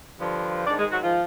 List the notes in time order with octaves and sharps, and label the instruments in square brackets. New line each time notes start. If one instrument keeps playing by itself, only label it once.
[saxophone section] G2 D3 F3
G#2 D4 D5
D#3
G#3 G#4
F#3 F#4
F3 F4